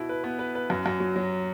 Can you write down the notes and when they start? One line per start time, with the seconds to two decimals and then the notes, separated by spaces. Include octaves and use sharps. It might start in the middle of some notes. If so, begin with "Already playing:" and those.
Already playing: B2 E4
0.09 B4
0.24 B3
0.39 B4
0.55 B4
0.70 F#2
0.86 F#2
1.00 F#3
1.16 F#3